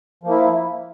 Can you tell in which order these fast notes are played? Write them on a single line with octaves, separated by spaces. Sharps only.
F3 A#3 E4